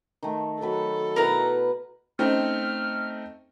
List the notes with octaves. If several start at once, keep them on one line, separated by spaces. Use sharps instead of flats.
D#3 A3
D#3 F#3 A4 B5
B2 E4 A#4 B4 A#5
A3 C4 C#4 D#4 C5 G5 F6